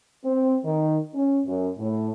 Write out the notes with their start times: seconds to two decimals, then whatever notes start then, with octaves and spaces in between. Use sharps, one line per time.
0.25 C4
0.65 D#3
1.15 C#4
1.46 F#2
1.79 A2